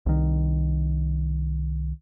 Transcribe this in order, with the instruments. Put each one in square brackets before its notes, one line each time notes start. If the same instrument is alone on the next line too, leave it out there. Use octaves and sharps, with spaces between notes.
[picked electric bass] C2 D#3